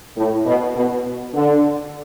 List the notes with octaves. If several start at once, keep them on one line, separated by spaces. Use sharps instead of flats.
A2
B2
B2
D3